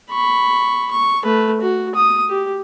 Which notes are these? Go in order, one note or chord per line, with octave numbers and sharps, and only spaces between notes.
B5 C#6
C#6
A3 B4
F#4
D#6
G4